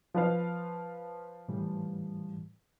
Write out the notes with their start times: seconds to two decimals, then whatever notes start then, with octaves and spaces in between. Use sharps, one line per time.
0.14 F3 B4 F5
1.48 A2 E3 G3